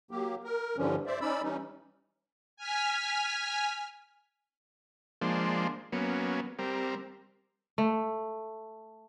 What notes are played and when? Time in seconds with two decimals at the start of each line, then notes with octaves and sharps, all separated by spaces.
0.11 F#3 A#3 G4
0.44 A#4
0.77 G2 D3 E3 F3 G3 C#4
1.06 C5 D5 E5
1.21 C#4 D#4 D5 B5 E6
1.42 E3 G3 C#4 D#4
2.57 G#5 F6 B6
5.21 F3 G#3 A#3 D4 C5
5.92 F#3 A#3 B3 C#4
6.59 G3 C4 A#4
7.78 A3